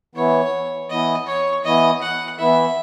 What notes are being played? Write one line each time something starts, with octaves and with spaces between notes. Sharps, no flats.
E3 B3 E4 C#5
E3 B3 E4 D#5
C#5
E3 B3 E4 D#5
F#5
E3 B3 E4 E5